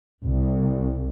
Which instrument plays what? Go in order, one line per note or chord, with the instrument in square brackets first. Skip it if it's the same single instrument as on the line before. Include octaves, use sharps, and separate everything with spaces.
[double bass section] C2